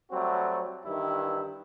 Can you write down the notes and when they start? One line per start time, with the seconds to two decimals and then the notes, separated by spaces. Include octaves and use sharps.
0.11 F#3 G3 A3 C4 F#4
0.85 G2 D#3 E3 G3 E4